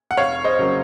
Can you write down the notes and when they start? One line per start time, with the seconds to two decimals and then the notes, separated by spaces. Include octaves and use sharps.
0.11 F#5
0.17 F1 C#5 F5
0.44 C5 D#5
0.59 C#3 F#3 A#3